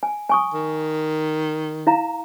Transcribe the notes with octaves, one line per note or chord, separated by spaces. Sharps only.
G#5
G#5 C#6 D#6
D#3
E4 F5 A#5